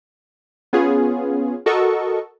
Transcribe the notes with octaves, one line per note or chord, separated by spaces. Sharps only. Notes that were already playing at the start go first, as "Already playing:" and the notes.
B3 C#4 F4 G#4
F#4 A4 A#4 D#5 C#6